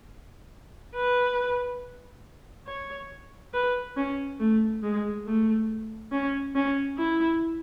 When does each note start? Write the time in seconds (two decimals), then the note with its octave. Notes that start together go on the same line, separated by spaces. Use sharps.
0.96 B4
2.67 C#5
3.54 B4
3.97 C#4
4.40 A3
4.83 G#3
5.26 A3
6.12 C#4
6.55 C#4
6.98 E4